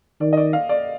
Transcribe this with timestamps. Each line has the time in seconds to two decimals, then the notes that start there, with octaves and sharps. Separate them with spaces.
0.21 D#3 D5
0.33 D#5
0.37 D5
0.53 F5
0.69 D5